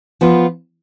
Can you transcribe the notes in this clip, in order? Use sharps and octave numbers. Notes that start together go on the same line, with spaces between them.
F3 B3 F4